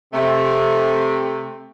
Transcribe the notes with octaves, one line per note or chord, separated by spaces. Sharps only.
C3 A3